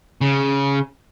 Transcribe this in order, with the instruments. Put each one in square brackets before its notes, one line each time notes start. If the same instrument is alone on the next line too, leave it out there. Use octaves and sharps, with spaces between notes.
[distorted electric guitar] C#3